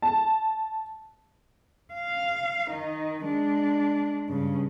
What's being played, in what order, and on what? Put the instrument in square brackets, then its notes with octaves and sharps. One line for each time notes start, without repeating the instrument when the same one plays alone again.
[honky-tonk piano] A5
[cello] F5
D#3 D#4
G#3 D4
G2 C#3